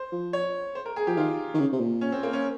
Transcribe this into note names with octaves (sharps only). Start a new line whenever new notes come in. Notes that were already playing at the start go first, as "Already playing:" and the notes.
Already playing: C5
F3
C#5
C5
A#4
G#4
F3 G4
D#3 F4
D#3
C#3
C3
A#2
C#4
C4
A#3
C#4